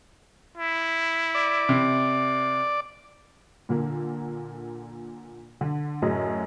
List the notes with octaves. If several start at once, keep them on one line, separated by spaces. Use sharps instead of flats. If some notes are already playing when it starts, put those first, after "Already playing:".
E4
D5
C3
A#2 D3 A#3
D3
F#2 A2 G#4 D#5